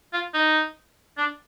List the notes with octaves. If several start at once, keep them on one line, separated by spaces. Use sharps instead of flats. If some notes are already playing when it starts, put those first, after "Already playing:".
F4
D#4
D4